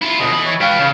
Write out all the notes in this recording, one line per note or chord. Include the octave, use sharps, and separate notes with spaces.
E4 F4
D2 B2 D#5
E3 B5
C#5
B4 F5 G5
C#3